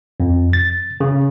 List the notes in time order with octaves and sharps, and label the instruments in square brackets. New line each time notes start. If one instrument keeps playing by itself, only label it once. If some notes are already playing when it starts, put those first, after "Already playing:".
[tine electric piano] F2
A6
C#3